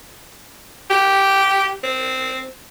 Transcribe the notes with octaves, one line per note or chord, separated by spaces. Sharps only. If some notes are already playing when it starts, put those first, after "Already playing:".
G4
C4